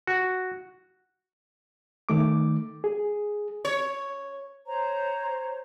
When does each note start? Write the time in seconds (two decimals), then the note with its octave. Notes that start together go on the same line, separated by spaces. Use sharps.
0.07 F#4
2.09 D#3 A3 D6
2.84 G#4
3.65 C#5
4.67 C5 C#5 A#5